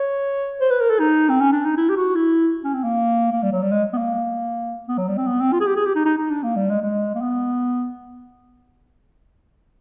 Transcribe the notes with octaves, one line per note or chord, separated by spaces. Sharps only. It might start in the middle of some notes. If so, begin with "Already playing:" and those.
Already playing: C#5
C5
B4
A#4
A4
D#4
C4
C#4
D4
D#4
E4
G4
F#4
E4
C#4
C4
A#3
A#3
G3
F#3
G3
G#3
B3
A#3
B3
F#3
G3
C4
B3
C4
F4
G#4
G4
G#4
G4
D#4
D#4
D#4
D4
A#3
G3
G#3
G#3
A#3
B3